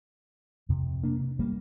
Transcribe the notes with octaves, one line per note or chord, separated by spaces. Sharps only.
F2 C3
A#3 D4
G3 A#3